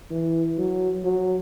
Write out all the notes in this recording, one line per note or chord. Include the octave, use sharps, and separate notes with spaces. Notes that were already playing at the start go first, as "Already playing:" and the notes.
E3
F#3
F#3